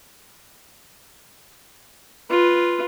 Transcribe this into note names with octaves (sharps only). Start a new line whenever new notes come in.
F4 B4